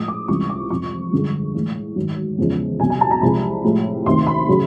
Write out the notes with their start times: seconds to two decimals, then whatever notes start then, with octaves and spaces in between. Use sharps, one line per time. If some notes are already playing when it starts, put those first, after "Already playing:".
Already playing: A2 F3 G#3 D#6
0.08 D6
0.28 C#2 C3 E3 G3 C#6
0.50 D6
0.70 F2 C3 F3 C#6
1.12 G2 D3 F3 G#3
1.54 A2 E3 G#3
1.96 G#2 D#3 F#3
2.38 E2 C#3 F3 G#3
2.80 C2 G#5
2.82 B2 F#3
2.90 G#5
3.01 A5
3.11 A#5
3.21 C2 C3 F3 G#3 B5
3.64 A2 F3 G#3
4.06 D2 C3 D#3 C6
4.27 B5
4.48 C#3 F#3